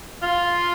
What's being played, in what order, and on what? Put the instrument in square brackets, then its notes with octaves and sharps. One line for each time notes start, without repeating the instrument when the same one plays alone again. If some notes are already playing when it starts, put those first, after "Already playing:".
[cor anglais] F4